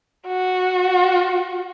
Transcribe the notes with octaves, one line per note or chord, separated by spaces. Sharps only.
F#4